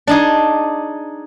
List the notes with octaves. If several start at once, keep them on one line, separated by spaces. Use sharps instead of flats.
D4 D#4 G#4